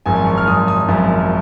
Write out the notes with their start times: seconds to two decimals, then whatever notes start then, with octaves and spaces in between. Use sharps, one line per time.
0.06 G#1 F#2 F3 G#5
0.16 G#5
0.27 C#6
0.37 F6
0.48 G#1 F#2 F3 D#6
0.68 D#6
0.88 G#1 F#2 F3